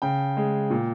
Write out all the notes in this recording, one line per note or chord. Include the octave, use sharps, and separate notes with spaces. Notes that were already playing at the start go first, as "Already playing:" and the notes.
C#3 G5
G#3
A#2